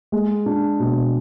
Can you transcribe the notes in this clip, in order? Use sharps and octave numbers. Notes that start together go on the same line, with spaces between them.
G#3
D4
B2